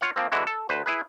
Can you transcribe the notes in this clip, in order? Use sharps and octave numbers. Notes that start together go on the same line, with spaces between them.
F4 C#5 F5 F#5
F3 A#3 C4
D3 E3 G#3 E4 F#4
A4
D2 B4 C5
E4 G#4 B4